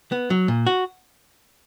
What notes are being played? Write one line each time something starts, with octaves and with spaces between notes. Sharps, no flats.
B3
F#3
A#2
F#4